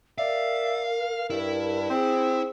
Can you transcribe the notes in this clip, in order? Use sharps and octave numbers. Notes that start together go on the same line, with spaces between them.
A#4 D5 E5 F5
G2 E4
C4 G#4